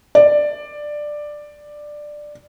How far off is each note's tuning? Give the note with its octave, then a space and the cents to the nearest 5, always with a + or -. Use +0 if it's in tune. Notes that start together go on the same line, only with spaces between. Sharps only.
D5 +10